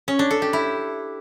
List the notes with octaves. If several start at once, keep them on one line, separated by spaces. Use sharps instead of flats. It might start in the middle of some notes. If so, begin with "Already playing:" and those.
C#4
D4
A4
G4
E4